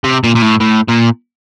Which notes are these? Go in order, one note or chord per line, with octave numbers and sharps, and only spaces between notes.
C3
A#2
A#2
A2
A2
A#2